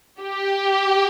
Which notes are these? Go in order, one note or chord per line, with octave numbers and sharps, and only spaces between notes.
G4